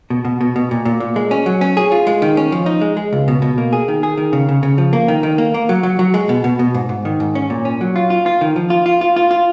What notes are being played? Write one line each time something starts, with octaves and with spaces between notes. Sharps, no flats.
B2
B2
B2
B2
A#2
A#2
A#2
G#3
C#4
F#3
C#4
G#4
F4
G#3
D#3
C#4
F3
D#4
G#3
G#3
C#2
B2
B2
A#3
G#4
D#3
G#4
D#3
C#3
C#3
C#3
F3
A#3
D#3
D#3
A#3
A#3
F#3
F#3
F#3
G#3
B2
B2
B2
G#2
G#2
D#3
G#2
C#4
A#2
C#4
F#3
F4
F4
F4
D#3
F3
F4
F4
F4
F4
F4